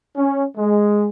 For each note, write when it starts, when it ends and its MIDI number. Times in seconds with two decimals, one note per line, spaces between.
0.16 0.45 61
0.57 1.09 56